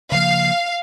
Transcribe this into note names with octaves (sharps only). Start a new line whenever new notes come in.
C#3 F3 A#3 F5